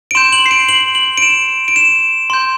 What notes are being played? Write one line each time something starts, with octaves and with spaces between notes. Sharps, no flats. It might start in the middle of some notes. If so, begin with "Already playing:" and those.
D7
C6 G6 E7
F#7
C7
D7
F#7
F#7
D7
E7
D7
E7
C6 G6